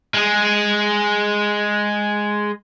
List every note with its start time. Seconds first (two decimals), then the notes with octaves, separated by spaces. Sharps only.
0.14 G#3 G#4